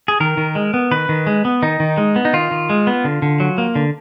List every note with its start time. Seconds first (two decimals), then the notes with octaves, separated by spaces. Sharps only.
0.08 G#4
0.20 D#3 A#4
0.37 D#3
0.55 G#3
0.74 B3
0.91 D#3 B4
1.09 D#3
1.27 G#3
1.45 B3
1.62 D#3 D#4
1.80 D#3
1.97 G#3
2.16 B3
2.25 D#4
2.33 D#3 F4
2.51 D#3
2.70 G#3
2.87 B3
3.05 D3
3.22 D3
3.40 F#3
3.58 A#3
3.75 D3